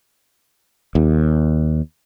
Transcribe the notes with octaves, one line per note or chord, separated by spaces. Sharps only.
D#2